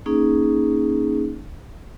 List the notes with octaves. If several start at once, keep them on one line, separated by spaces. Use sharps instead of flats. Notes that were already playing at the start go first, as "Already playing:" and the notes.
A#3 C#4 D#4 G#4